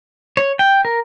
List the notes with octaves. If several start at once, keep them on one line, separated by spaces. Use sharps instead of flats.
C#5
G5
A#4